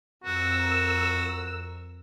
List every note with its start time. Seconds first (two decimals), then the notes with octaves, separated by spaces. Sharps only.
0.24 F2 F#4 A#4 E6